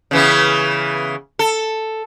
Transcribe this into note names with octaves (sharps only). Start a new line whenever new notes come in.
C#3 E3 B3
A4